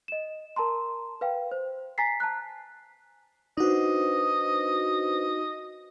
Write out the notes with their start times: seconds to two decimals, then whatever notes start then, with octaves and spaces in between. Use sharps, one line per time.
0.08 D#5 E7
0.56 A#4 A5 A#5 C6
1.21 B4 F5 G5
1.52 C5
1.98 G#5 A#5 A6 B6 C7
2.20 A5 A#5 F#6
3.58 D4 D#4 F#4 B4 C5 D#5